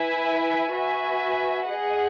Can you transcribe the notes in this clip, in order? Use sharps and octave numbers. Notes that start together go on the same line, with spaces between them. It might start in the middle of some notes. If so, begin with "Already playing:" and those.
Already playing: E4 B4 E5 G#5
F#4 B4 E5 G#5
G#4 D#5 F#5